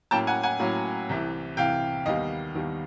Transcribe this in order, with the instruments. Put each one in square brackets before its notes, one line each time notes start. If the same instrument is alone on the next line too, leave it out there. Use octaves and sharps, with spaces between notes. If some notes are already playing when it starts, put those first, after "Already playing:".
[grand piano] A2 F#3 A#3 C#4 G5 A5
F#5 G#5
F#5 G#5
A2 F#3 A#3 C#4
C2 C3 E3
C2 C3 E3 F5 G5
D#2 D#3 G3 B3 D#5 F5
D#2 D#3 G3 B3